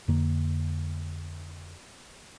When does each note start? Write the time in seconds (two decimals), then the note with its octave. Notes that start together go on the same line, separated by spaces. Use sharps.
0.08 F2 D3 A#3